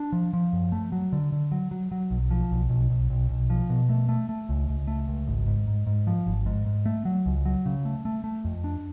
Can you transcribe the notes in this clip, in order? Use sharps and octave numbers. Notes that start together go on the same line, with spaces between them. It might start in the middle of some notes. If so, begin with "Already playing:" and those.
Already playing: D4
F3
F3
F#2
A3
F#3
D3
D3
F#3
F#3
F#3
B1
F3
B1
B1
B1
B1
B1
F3
B2
A3
A3
A3
C#2
C#2
A3
C#2
G#1
G#2
G#2
G#2
F3
G#1
G#2
G#2
A3
F#3
C#2
F#3
C#3
A3
A3
A3
F2
D4